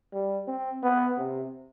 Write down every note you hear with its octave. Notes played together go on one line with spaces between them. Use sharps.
G3
C4
B3
C3